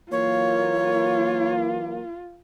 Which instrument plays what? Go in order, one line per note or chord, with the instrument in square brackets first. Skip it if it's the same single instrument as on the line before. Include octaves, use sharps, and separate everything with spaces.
[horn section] E3 F#3 A#3 [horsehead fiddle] F4 [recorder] C#5